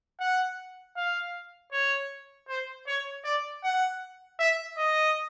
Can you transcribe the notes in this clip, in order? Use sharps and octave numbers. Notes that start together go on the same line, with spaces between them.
F#5
F5
C#5
C5
C#5
D5
F#5
E5
D#5